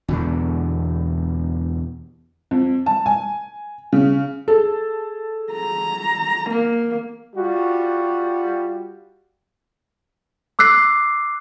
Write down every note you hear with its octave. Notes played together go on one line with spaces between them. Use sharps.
E2 B2 D3
F2
A5
G#5
C#3
G#4 A4
A#5
A#3
G3 F4 F#4
D6 E6 F#6 C7